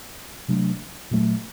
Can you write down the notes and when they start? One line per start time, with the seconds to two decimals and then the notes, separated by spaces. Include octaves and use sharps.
0.48 C3 F#3 A3 D4
1.11 A#2 F#3 A3